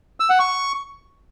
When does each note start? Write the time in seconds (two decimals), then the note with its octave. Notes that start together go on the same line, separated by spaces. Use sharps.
0.20 E6
0.30 F#5
0.39 C#6